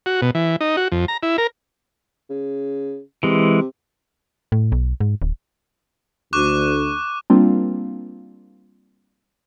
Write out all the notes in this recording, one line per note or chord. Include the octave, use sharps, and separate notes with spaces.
F#4
B2
E3
D#4
F#4
F2
A#5
E4
A#4
C#3
C3 E3 G#3
A2
B1
G#2
D1
D2 C#6 D6 F#6
G3 A#3 C4 D4 F4